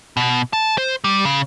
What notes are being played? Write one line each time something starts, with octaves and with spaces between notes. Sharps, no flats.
B2
A5
C5
G3
C#3